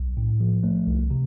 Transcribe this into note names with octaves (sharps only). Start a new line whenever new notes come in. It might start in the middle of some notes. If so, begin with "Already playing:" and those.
Already playing: B1
A2
F3
A3
C2
C3